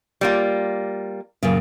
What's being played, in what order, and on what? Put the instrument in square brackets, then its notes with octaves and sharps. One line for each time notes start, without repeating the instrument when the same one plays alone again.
[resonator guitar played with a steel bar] G3 A#3 F4
[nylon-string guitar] F#2 A#2 C#3